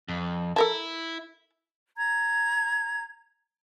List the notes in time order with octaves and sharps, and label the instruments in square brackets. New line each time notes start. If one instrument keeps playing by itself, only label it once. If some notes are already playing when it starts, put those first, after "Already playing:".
[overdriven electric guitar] F2
[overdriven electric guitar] E4 [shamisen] A4 A#4 A5
[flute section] A#5 G#6